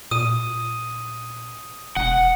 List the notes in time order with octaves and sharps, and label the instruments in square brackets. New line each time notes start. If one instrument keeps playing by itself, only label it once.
[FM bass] A#2 [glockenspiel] D#6 D#7
[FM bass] E1 [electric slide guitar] F#5